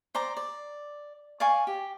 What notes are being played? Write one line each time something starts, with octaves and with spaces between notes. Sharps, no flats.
C5 D5 A#5
D5
D5 F5 G#5 C#6
G4